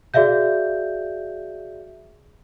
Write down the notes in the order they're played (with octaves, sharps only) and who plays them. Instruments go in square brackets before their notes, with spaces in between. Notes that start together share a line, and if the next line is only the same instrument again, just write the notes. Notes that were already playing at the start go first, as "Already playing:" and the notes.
[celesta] F#4 G#4 D5 E5 F5 G6